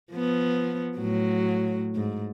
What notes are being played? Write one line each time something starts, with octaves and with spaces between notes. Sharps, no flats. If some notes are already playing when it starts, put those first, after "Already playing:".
F3 B3
A2 F#3
G#2